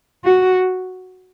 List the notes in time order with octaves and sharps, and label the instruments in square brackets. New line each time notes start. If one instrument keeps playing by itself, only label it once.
[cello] F#4